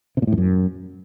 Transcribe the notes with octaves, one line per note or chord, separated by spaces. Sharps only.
C3
A#2
A2
F2
F#2